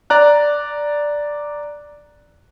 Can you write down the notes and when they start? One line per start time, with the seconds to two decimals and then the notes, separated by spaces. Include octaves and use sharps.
0.10 D5 A#5 F#6